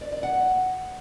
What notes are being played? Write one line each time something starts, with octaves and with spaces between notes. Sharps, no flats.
D5
D5
F#5